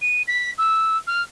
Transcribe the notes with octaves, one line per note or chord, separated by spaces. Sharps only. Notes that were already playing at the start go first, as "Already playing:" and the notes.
D#7
B6
E6
F6